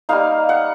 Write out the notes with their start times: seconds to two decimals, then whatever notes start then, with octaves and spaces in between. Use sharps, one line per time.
0.09 G3 A#3 D#4 F5
0.49 F#5